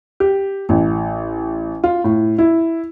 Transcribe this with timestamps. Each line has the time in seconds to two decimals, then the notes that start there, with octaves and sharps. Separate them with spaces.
0.20 G4
0.69 A1
1.84 F4
2.04 A2
2.38 E4